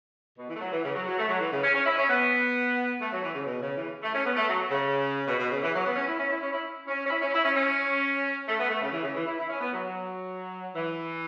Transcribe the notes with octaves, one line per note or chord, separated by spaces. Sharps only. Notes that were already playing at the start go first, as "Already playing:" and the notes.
B2
E3
A3
F#3
E3
C#3
F#3
F#3
A3
F#3
E3
C#3
C#4
C#4
E4
C#4
B3
A3
F#3
E3
C#3
B2
C#3
E3
A3
C#4
B3
A3
F#3
C#3
B2
B2
C#3
E3
F#3
B3
C#4
E4
C#4
E4
C#4
E4
C#4
C#4
E4
C#4
E4
C#4
C#4
A3
B3
A3
C#3
E3
C#3
E3
E4
E4
C#4
B3
F#3
F#3
E3